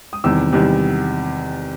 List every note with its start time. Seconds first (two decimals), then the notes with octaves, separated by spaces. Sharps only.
0.13 D#6
0.24 E2 C3 D#3 G3 E6
0.53 E2 C3 D#3 G3